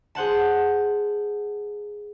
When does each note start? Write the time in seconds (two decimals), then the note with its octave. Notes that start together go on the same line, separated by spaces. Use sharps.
0.15 G#4 C5 F#5 A5